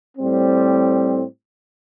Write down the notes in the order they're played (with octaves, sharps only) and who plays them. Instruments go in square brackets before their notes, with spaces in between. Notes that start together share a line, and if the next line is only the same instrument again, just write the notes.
[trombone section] A2 G3 C4